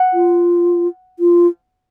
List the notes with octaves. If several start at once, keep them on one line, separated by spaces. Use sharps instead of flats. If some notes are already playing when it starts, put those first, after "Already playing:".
Already playing: F#5
F4
F4